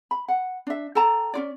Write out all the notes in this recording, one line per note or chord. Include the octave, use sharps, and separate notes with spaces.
B5
F#5
D4 E5
A4 G5 A5 A#5
C#4 F4 D5